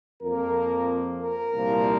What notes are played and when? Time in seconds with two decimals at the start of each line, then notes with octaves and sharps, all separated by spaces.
0.22 F2 F3 A#3 A#4
1.22 A#4
1.54 C2 A#2 F3 A#3